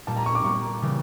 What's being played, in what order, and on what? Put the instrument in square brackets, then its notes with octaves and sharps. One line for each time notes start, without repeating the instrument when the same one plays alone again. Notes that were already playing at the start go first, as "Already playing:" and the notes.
[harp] A#2 G3 A#3 [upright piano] A5
[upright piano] A#5
C#6
D6
[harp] A#2 G3 A#3 [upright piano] C#6
[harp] C#3 E3 G3